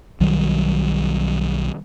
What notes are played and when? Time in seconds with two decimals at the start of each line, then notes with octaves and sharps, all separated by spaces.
0.20 B1 D#3 F#3 G3